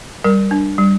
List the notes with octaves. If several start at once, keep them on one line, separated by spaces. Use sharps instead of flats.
G3 A#4
D4
G3